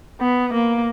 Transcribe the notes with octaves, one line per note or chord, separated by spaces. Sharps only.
B3
A#3